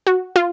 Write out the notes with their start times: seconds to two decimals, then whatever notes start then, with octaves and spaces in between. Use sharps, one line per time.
0.07 F#4
0.36 F4